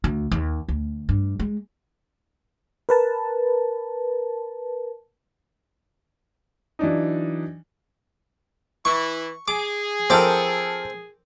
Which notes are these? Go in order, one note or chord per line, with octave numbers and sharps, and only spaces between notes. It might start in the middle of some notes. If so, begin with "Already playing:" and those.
D2
D#2
D2
G2
G#3
A#4 B4 A5
E3 F#3 D4 D#4
E3 E4 C#6
G#4 D6
F3 C4 A4 A#4 D6